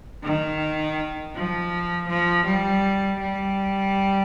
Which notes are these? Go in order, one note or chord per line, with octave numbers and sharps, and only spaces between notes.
D#3
F3
F3
G3
G3